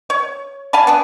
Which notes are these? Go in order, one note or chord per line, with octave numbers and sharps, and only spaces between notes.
C#5
F5 G#5 A5 B5
B3 D4 G#4